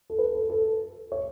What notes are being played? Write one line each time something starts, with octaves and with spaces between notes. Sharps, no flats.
A4
B4
A4
A4
C#5